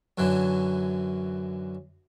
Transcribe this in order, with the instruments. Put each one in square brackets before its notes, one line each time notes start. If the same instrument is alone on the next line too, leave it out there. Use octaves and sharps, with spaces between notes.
[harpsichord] F#2 D3 E3 F#3